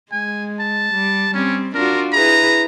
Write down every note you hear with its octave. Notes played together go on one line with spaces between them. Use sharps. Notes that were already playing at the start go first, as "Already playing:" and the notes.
G#3 G#5
A5
G3
G3 C4 C#4
D4 F4 F#4 A#4
E4 G#4 B4 A#5